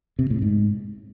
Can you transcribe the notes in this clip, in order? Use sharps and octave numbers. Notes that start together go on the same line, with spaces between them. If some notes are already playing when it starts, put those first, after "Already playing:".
C3
A2
G#2